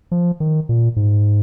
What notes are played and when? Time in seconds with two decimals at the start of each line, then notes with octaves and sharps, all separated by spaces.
0.11 F3
0.40 D#3
0.69 A#2
0.96 G#2